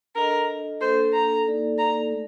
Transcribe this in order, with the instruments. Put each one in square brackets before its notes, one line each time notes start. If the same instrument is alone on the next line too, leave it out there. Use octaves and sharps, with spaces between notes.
[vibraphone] D4 A4 D#5 [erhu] A#4
[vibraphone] A#3 D4 A4 [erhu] C5
[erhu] A#5
[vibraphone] A#3 D#4 A4 D5
[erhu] A#5
[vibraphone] A3